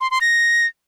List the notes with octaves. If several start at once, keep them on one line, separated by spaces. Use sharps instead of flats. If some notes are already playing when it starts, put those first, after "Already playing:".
C6
C6
A#6